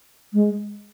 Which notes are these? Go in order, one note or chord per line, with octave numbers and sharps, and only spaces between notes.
G#3